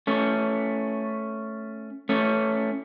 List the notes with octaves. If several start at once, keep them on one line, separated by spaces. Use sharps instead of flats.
A3 C#4
A3 C#4